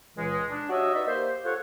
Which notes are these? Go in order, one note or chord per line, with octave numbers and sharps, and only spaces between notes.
C#2 A#2 E3 G#3
D4
F#4 G4 C#5 D#5 E5
D#4 B4 D5 E5
A#3 G4 C5
F4 A4 C5 C#5 F#5